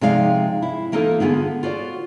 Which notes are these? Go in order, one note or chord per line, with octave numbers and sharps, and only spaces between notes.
C3 F3 G#3 D#4 D5 F5
E4
E3 A#3 D#4 F4 A4
D3 B3 F4 G#4
F4 F#4 C5 D5